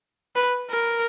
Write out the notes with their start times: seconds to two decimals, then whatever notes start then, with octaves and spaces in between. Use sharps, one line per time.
0.36 B4
0.71 A#4